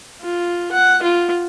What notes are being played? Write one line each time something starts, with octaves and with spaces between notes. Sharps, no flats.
F4
F#5
F4